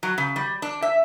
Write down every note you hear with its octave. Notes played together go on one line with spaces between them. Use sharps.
F#3
C#3
G3
D4
E5